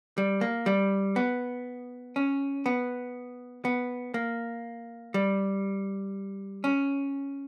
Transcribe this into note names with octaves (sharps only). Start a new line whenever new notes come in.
G3
A#3
G3
B3
C#4
B3
B3
A#3
G3
C#4